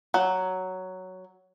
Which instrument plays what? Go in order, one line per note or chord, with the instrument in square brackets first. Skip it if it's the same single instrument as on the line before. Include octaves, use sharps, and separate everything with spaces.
[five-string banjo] F#3